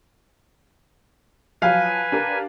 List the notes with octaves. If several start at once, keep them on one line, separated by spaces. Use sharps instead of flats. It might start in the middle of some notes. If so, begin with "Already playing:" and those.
F3 F#3 B4 F5 G#5
D4 G4 A#4